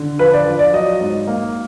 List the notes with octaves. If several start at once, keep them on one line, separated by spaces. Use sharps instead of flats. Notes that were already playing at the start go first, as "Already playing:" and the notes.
Already playing: D3
F3 B4
D5
F3
D5
F#3 D#5
G#2
A#3